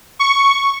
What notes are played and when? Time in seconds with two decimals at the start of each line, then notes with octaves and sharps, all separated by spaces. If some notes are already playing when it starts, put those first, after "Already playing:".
0.19 C#6